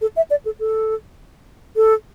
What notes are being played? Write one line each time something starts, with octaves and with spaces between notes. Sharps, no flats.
A4
E5
D5
A4
A4
A4